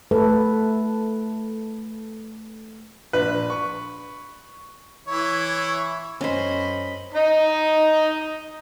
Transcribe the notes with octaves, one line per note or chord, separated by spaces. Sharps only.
A3 A4 B4
A#1 B4
C#6
E3 E4 C#5
F#2 C#4 C5 D#5 B5
D#4 D#5 A#5